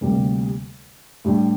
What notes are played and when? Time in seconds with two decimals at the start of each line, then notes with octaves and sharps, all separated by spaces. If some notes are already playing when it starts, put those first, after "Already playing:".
0.01 D2 C3 G3 A#3
1.25 A2 G3 D4 G4